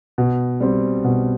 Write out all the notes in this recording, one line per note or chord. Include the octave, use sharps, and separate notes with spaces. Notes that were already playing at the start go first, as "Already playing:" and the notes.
B2
G3 C4
B2